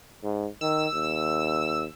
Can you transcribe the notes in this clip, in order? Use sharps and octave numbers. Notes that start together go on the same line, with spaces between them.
G#2
D#3 E6
D#2